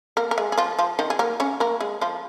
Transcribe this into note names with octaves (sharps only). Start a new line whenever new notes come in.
A#3 A#4
A#4
G#3 G#4
G#4
F3 F4
F3 F4
D#3 D#4
G#4
A#3 A#4
C#4 C#5
A#3 A#4
G#3 G#4
F3 F4